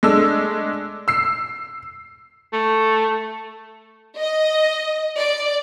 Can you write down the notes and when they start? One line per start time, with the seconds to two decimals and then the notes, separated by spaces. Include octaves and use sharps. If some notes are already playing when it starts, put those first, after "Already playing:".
0.03 G#3 A3 D4 E6
1.08 E6 C7
2.53 A3
4.19 D#5
5.19 D5